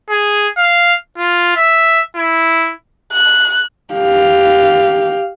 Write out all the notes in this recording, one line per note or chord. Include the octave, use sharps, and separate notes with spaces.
G#4
F5
F4
E5
E4
F#6
G4 F5